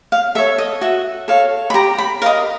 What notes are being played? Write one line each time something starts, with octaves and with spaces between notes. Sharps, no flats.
F5
A4 C#5 E5
D#5
F#4 E5
A4 C#5 F5
B5
G4 A#5
B5
A#4 D#5 F5